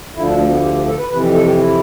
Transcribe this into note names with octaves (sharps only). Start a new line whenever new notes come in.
D2 D3 F3 E4
D4
A3
B3
G4
G4
A4
B4
F2 C3 E3 B4
G4
A4
G4
E4